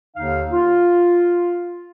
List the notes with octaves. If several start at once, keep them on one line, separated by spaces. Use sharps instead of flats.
D#2 D3 D#4 F5
F4